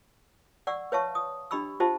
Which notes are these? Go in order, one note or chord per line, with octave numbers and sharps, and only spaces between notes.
D5 F#5 C#6 E6
B4 C#5 E5 F5 A5 C#6
D#6
D4 G4 D#5 B5 C#6 E6
F4 G4 C5 D#5 F5 A5